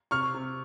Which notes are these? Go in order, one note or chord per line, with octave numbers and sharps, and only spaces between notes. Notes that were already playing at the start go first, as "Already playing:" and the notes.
C3 C#6 F6
C3